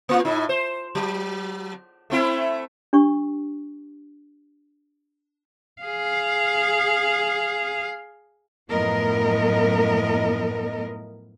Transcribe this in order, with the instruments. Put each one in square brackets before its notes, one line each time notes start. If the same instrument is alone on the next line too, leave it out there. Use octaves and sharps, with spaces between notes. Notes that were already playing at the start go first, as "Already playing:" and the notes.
[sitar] A#3 F4
A2 D#4
C5
F#3
A3 C4 E4
[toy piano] D4 G4 C#6
[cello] G#4 F5
[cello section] F#2 A2 F3 B3 A#4 D#5